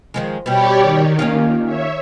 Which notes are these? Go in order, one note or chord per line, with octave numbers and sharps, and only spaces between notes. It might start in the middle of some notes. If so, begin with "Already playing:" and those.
D#3 F3 G#3
B2 G3 G4 C#5 D5
D#3
A#3 C#4 F4
C#5 E5